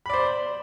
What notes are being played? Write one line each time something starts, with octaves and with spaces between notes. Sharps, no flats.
C5 D5 B5